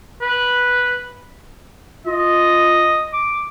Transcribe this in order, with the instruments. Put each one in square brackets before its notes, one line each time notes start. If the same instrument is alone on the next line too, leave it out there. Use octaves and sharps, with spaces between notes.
[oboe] B4
[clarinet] F4 [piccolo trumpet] D#5
[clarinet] D6